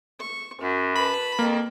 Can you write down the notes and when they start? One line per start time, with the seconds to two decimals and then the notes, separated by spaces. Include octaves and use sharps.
0.20 C#6
0.61 F#2 F#4
0.96 B4 A5 B5
1.39 F2 A#3